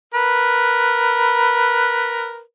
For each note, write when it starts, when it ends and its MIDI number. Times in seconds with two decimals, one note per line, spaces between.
0.14 2.41 70
0.14 2.41 71